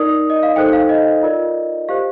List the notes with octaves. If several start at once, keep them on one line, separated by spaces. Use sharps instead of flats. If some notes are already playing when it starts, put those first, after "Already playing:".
Already playing: D#4 A#4 D5 D#6
D#5
F5
D#4 A4 C5 G5
F5
D#5
F4 A#4 D5
G4 C5 F5